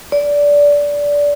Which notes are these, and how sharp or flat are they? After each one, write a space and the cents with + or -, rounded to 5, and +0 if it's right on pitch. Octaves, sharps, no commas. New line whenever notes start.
D5 -15